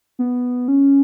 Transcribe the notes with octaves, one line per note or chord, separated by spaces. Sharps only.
B3
C#4